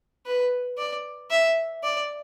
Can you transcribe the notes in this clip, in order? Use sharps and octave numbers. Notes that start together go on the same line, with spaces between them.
B4
D5
E5
D5